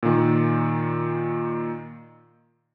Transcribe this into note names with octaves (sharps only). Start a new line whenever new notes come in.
A#2 D#3